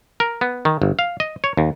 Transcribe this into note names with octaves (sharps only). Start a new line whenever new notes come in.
A#4
B3
D#3
G1
F5
D#5
C#5
D#2